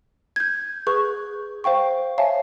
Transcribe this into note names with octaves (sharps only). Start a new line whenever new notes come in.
G6 G#6
G#4 B4 C#6 G6
C5 F5 G5 C#6
C#5 E5 F5 G#5 A5